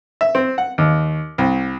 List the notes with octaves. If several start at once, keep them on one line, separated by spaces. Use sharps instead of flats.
E5
C4
F#5
D#2
C2